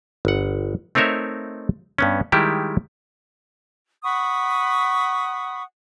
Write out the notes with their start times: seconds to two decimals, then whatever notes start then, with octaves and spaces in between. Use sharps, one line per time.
0.25 G1 F#5
0.95 A3 C4 D#4 A#4 C#5 E5
1.98 G2 B3 C#4
2.32 D#3 G3 G#3 E4 G4
4.03 F#5 B5 C#6 D#6